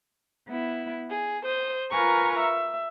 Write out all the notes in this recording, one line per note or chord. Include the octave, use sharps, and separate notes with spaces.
B3 E4
G#4
C5 D#6 G6
F4 A#4 B4 G#5 A#5 C#6
E5